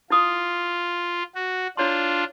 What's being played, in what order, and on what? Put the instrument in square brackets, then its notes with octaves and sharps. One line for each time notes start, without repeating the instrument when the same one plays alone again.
[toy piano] E4 D#6 [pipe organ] F4
[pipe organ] F#4
[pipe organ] D4 F4 [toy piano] E4 C#5 C6